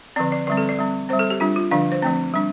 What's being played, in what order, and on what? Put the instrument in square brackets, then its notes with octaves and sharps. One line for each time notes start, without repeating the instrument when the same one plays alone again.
[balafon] D3 F3 C4 D5
D5
D3 G3 C4 D5
A4
D5
G3 C4
C4 C5
G3
A4
G4
G3 D4 F4
F4
D3 F3 D4 F5
C5
F3 A3 C4
G3 D4